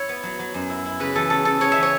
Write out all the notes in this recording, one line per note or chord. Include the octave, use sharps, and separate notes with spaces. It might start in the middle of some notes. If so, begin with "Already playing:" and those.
Already playing: E4 C#5
B3
F#3
F#3
F#2
E4
E4
C#3 B4
E3 A4
C#3 A4
C#3 A4
C#3 C#5
E3 E5
C#5